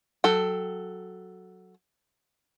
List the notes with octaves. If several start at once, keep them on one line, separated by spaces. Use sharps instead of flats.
F#3 A4 G5